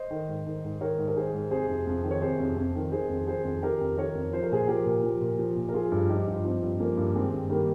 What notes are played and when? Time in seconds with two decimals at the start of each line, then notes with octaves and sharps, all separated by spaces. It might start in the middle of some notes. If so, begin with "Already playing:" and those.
Already playing: C5 D#5
0.11 D#3
0.28 G#2
0.46 D#3
0.64 G#2
0.81 D#3 A#4 C#5
0.98 G#2
1.08 A#4
1.16 D#3 G#4 C5
1.34 G#2
1.51 C3 G#4 C5
1.68 F2
1.87 F2
2.04 D#3
2.11 C#5
2.22 C3 G#4 C5
2.40 F2
2.57 F2
2.75 D#3
2.92 D#3 G#4 C5
3.09 F2
3.27 D#3 G#4 C5
3.45 F2
3.62 D#3 G4 A#4
3.81 F2
3.97 D#3 A#4 C#5
4.15 F2
4.33 F3 C5
4.43 A#4
4.51 A#2 G#4 C5
4.68 F3 G4 A#4
4.85 A#2
5.04 F3
5.21 A#2
5.39 F3
5.56 A#2
5.69 A#4
5.74 F3 F4 G#4
5.92 G2
6.09 F3 D#4 G4
6.27 G2
6.33 F4
6.44 F3 C4 D#4
6.62 G2
6.79 F3 A#3 C#4
6.97 G2
7.15 D#3 G#3 C4
7.33 G2
7.50 D#3 G3 A#3